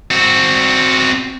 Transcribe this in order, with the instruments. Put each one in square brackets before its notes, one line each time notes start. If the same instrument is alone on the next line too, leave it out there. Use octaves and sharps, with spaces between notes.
[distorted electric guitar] C4 F#4